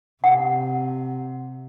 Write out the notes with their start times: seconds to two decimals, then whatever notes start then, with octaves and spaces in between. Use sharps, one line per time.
0.24 C3 F#5